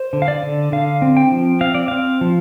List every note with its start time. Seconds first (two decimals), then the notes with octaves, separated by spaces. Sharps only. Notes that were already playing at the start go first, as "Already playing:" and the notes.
Already playing: C5
0.13 D3
0.22 F5
0.28 D5
0.43 D3
0.72 D3 F5
1.02 C4
1.17 G5
1.32 F3
1.61 C4 F5
1.74 D5
1.88 C4 F5
2.21 F3